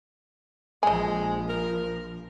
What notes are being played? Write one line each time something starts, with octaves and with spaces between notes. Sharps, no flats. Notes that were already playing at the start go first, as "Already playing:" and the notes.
A#1 F3 G#3 D#5 G#5
A#4